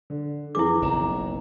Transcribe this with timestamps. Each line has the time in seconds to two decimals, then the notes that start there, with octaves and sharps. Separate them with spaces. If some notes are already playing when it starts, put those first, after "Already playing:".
0.10 D3
0.55 F2 E3 E4 G#4 D6
0.82 F#1 B1 F#2 A#5 E7